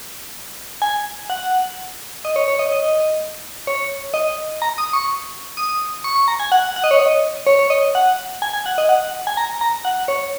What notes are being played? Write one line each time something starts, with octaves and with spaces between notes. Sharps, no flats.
G#5
F#5
D#5
C#5
C#5
D#5
D#5
C#5
D#5
A#5
D#6
C#6
D#6
C#6
C#6
A#5
G#5
F#5
F#5
D#5
C#5
D#5
C#5
C#5
D#5
F#5
G#5
G#5
F#5
D#5
F#5
G#5
A#5
A#5
F#5
C#5